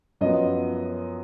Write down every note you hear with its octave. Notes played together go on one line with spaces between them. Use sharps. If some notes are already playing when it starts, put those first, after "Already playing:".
F#2 F3 B3 D#5